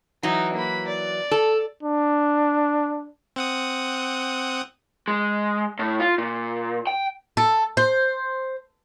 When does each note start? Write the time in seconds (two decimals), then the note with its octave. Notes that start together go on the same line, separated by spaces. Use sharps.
0.23 E3 F#3 D#4
0.54 A#3 B5
0.87 D5
1.31 A4
1.83 D4
3.36 C4 F#5 D#6
5.08 G#3
5.79 A2
6.00 F4
6.18 A#2
6.87 G5
7.37 A4
7.77 C5